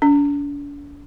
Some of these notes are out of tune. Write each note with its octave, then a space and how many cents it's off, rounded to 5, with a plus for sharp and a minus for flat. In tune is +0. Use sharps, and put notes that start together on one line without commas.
D4 -45